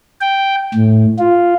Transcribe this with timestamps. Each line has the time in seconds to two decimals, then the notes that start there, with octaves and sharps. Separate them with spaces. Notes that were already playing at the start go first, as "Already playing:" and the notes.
0.21 G5
0.74 A2
1.19 F4